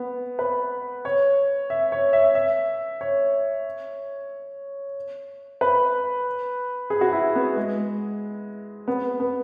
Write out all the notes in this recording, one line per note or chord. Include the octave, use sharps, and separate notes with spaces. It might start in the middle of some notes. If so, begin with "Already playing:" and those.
Already playing: B3
B4
C#5
E5
C#5
E5
E5
C#5
B4
G#4
F#4
E4
B3
G#3
B3
B3